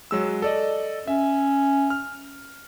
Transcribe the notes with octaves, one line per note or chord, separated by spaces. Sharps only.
F#3 G#3 E6
A4 D5 D#5
C#4 E5
F6